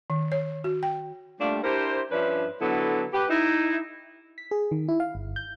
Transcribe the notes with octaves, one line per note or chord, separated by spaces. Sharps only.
D#3
C#5
F#4
G5
G3 A3 A#3 D4 F4 G4
D4 E4 G4 A#4 C5
G2 F3 C#4 D4 B4 E5
D3 F#3 B3 E4 A4
G4 B4
D#4 E4
B6
G#4
D#3
E4
F5
G1
G6